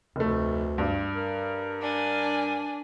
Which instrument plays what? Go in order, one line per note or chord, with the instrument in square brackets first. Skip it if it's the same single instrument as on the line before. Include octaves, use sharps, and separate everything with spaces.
[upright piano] F1 A3 [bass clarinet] D2
[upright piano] G2
[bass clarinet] A#4
[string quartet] D4 G#5